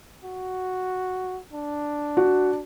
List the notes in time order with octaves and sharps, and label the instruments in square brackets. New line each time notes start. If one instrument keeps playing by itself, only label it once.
[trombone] F#4
D4
[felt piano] F#4